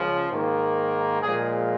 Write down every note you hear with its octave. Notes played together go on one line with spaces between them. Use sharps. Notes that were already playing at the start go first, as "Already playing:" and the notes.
Already playing: C#2 C#3 F3
G#2 D#3 A#3
A#2 F3 G#3 G#4